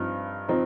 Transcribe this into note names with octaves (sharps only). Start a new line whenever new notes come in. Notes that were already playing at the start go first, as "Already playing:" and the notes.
Already playing: G2 F3 C4 D#4
F3 C4 D#4